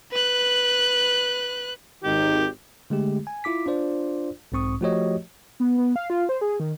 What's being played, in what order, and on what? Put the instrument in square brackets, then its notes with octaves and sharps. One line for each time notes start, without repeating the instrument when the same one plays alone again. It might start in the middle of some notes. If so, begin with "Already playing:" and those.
[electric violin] B4 F#6
[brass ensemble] G#1 D#3 D#4 [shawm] G4
[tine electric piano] D3 G#3 A3 G4
G#5
E4 F4 D6 B6
D4 F4 C5 D5
B1 G#2 C4 C#6 D#6
F3 A3 F#4 G4 C#5 D#5
[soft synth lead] B3
B3
F5
F4
C5
G#4
D#3